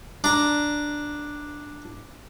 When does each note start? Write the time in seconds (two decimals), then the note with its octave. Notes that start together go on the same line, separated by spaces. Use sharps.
0.24 D4 A#5